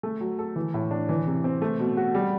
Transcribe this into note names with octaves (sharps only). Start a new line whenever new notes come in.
A3
F#3
A4
E3
A2
D4
E3
C3
C4
A3
B2
F#4
G3